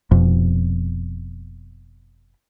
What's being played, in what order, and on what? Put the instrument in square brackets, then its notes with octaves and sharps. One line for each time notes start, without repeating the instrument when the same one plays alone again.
[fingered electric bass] F1 F2 B2